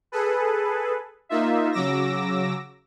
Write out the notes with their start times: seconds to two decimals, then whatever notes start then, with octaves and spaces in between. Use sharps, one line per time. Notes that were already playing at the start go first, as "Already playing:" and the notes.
0.12 G#4 A4 B4
1.29 A#3 D#4 F4 E5
1.72 C#3 F#3 D6 E6 A#6